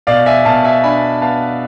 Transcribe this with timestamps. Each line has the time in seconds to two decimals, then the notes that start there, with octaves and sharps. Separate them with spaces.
0.07 B2 D5 F5
0.26 E5 G#5
0.45 B2 F5 A5
0.64 E5 G#5
0.83 D4 G#5 B5
1.22 B3 F5 A5